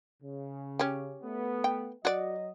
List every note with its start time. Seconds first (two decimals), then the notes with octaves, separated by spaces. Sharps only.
0.23 C#3
0.79 C#4 G4
1.23 A3 B3
1.64 G5
2.05 F#3 F#4 D5 D#5